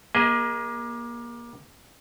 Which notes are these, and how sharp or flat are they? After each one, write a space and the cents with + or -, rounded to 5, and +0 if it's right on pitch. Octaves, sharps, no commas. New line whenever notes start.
A#3 +25 G#4 -20 D#5 +25